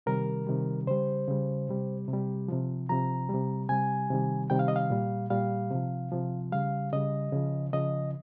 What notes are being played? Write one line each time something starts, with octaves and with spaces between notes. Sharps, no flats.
C3 D#3 G3 A#4
C3 D#3 G3
C#3 G3 C5
C#3 G3
C3 G3
C3
G3
C3 F3
C3 F3 A#5
G3
C3
C3 G3 G#5
C3 D#3 G3
C3 D#3 G3 G5
F5
D#5
F5
A#2 G3
A#2 G3 F5
C3 F3
C3 F3
C#3 G3 F5
C#3 G3 D#5
C#3 F3
C#3 F3 D#5